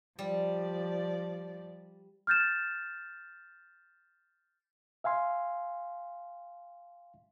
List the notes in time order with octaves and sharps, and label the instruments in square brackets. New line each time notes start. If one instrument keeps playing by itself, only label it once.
[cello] F3 D5 [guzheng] G3
[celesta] F6 G6 A6 E7
[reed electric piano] E5 F5 G#5 C6